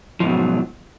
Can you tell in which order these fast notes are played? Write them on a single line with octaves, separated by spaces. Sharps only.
F3 G#2 B2 F#3